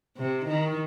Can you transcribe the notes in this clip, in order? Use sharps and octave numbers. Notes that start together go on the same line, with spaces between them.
C3
D#3